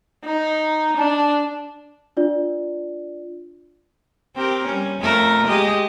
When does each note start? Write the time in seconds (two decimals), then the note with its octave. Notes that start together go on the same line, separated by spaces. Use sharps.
0.24 D#4
0.97 D4 A5
2.17 D4 F4 D5
4.36 C4 G4 A#4
4.66 G3 C#4
5.00 F2 A3 A#4
5.46 G#3 G4 D#5